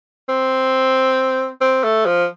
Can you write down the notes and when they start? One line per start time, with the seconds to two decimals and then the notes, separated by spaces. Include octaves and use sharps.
0.29 C4
1.61 C4
1.84 A3
2.06 F3